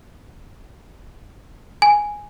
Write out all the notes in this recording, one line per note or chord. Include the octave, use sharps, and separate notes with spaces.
G#5